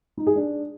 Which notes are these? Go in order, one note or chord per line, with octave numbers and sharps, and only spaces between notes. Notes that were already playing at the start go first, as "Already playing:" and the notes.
D#4
G#4
D4